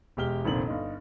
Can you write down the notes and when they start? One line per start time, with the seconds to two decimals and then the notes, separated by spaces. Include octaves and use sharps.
0.17 E1 G#3 G4 F6 G7
0.45 F1 A#1 D#3 C4 F#7
0.67 G1 D#4